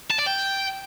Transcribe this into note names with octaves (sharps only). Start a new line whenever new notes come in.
A5
D5
G5